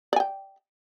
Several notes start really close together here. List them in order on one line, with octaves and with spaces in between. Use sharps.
D5 G#5 G5